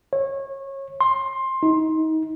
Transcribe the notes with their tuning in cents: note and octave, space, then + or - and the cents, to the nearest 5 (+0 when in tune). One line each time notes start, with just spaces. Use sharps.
C#5 -25
C6 +15
D#4 +30